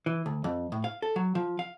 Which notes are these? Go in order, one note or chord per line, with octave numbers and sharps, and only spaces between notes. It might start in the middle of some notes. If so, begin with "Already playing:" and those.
E3
D2
F2
A2
F5
A4
F#3
F3
F5